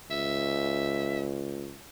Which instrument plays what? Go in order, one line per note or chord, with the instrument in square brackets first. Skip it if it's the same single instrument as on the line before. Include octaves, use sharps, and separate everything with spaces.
[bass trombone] C#2 [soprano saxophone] E5